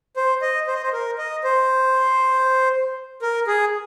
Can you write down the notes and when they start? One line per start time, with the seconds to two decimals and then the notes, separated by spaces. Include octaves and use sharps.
0.17 C5
0.42 D#5
0.67 C5
0.74 D#5
0.82 C5
0.93 A#4
1.18 D#5
1.44 C5
3.22 A#4
3.47 G#4